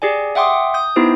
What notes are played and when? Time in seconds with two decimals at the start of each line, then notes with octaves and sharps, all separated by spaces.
0.02 G4 G#4 D5 G#5
0.35 E5 F#5 G5 C6 D6 D#6
0.74 D#6 G6
0.96 B3 D#4 E4 G4 C5